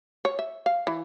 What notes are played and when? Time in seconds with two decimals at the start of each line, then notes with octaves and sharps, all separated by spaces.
0.25 C#5
0.39 E5
0.66 F5
0.87 E3